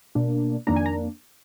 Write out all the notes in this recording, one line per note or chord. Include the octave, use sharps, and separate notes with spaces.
B2 A#3 D4
F2 D#3 A#3 D4 A#5
G#5
A#5